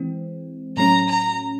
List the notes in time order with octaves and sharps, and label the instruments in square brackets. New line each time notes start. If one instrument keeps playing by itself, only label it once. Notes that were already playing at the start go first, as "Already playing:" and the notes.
Already playing: [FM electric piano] E3 G#3 C4
[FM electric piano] A2 F#3 A3 C#4 [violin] A#5
[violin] A#5